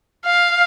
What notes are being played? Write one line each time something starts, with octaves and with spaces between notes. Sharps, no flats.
F5